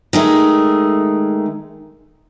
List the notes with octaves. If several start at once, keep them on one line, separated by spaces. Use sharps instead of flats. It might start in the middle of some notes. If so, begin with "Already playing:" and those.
D#3 G#3 A3